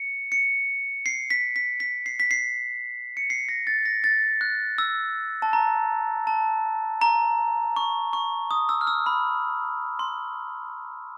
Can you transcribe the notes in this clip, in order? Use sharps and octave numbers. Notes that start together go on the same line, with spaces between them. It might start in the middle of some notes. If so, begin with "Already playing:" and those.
Already playing: C#7
C#7
C7
B6
B6
B6
C7
B6
C7
C#7
C7
A#6
A6
A#6
A6
F#6
E6
A5
A#5
A5
A#5
C#6
C#6
D#6
E6
F6
E6
B5
C6